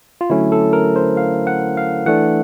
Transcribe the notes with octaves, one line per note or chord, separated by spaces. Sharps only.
F4
D3 F#3 A3 C#4 E4
A4
A#4
C5
F5
F#5
F5
E3 A3 D4 F#5